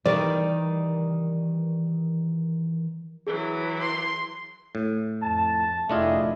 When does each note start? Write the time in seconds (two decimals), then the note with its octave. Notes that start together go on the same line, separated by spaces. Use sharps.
0.06 D#3 E3 G3 A#4 B4 D5
3.27 E3 F#3 G#4
3.81 C6
4.75 A2
5.22 F2 A5
5.89 F1 A3 D4 E4 F4 G4 G#4 D#5